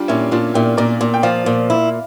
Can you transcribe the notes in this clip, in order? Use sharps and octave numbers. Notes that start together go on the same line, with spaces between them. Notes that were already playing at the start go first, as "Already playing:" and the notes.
Already playing: G3 D4 F4
A#2 C#4 E4
A#2 D4 F4
A#2 E4 G4
A#2 A#4 D5
A#2
G5
F3 D5 F5
A#2
E4